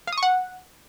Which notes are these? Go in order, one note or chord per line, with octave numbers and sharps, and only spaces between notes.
F5
D#6
C#6
F#5